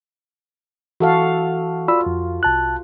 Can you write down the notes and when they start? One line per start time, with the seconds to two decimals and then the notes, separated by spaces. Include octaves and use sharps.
1.00 E3 F#4 A4 F5
1.88 F4 D5 B5 E6
2.06 F2
2.43 C2 A5 F#6